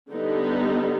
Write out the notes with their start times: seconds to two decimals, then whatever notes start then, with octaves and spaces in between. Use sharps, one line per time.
0.12 D3 G3 B3 D#4